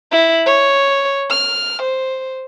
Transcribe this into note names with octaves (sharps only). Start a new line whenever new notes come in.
E4
C#5
F6
C5